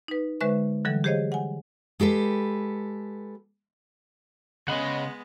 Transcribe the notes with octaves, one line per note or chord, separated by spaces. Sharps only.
D#4 B4
D3 G#3 B4 C5 E5 C#6
D3 E3 F#3 G3 A4
G4 G#4 C5 C#5 D#5 F5
F#5 G#5
G#3 G4 A4 B4
C#3 G#3 B3 C#4 D#5 F#5 B5 C6